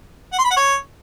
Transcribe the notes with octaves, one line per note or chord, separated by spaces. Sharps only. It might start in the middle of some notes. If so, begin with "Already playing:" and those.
F#5
C6
B5
F#5
C#5